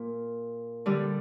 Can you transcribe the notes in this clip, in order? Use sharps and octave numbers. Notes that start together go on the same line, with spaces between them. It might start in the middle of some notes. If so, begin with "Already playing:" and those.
Already playing: A#2
D3 G3